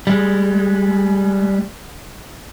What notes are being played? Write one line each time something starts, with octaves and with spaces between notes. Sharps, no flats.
G3 G#3